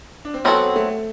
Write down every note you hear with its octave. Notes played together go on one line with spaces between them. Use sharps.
D4
C4
F#3 B3 C4 F#4 A4
A3